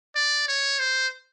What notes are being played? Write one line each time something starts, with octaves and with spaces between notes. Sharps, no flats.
D5
C#5
C5